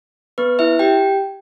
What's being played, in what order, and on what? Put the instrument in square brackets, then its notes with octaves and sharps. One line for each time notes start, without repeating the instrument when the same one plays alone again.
[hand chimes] B3 B4
E4 E5
G4 G5